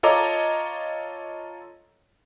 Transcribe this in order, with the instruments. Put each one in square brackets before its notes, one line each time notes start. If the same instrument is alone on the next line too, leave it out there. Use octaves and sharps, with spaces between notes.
[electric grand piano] F4 A4 C#5 D#5 A#5 D6